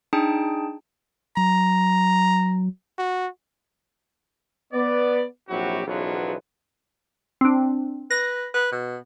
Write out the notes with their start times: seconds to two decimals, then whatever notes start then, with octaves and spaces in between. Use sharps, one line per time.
0.13 D4 D#4 G#4 G5 A5
1.37 F#3 A#5
2.98 F#4
4.73 B3 D5
5.49 A#1 C3 F#3 E4 F#4 G4
5.86 B1 E2 C#3 F3 F#3 B3
7.41 C4 D4
8.11 B4 A#6
8.54 B4
8.72 B2